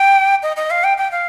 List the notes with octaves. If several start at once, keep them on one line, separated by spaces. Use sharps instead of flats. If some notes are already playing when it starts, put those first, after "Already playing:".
Already playing: G5
D#5
D#5
F5
G5
G5
F5